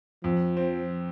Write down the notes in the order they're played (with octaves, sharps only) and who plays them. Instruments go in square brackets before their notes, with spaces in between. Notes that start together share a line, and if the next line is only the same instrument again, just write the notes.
[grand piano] F2 [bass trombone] F3
[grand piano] C4